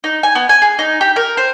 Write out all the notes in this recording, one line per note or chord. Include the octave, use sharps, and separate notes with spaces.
D#4
G#5
B3
G#5
G#4
D#4
G4
A#4
C5